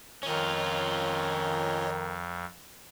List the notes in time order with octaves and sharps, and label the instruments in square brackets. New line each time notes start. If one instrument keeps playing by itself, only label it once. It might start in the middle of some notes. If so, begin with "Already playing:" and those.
[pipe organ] F2 [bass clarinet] D#3 [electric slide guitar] C#4 F4 [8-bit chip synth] C#5 D#5